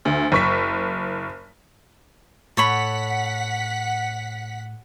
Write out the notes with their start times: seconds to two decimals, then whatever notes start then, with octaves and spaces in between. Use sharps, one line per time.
0.05 D2
0.32 F#1 C#6 B6
2.57 A2 A4 C#5 F#5 B5 B6